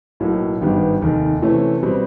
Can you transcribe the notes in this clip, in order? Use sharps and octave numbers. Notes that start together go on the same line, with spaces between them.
B1 A2 F#3 A#3
G#1 G2 D#3 G3 B3
F1 D#2 D#3
C3 E3 A3 C#4
B2 G3 C4